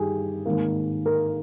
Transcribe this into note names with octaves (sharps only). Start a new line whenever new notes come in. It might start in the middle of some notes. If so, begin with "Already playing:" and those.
Already playing: G2 D#3 G3 G4 G#4
G#1 G#2 D#3 A#3
A#4